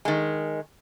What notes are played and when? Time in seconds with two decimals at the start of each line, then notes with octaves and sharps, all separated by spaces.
0.05 D#3 G#3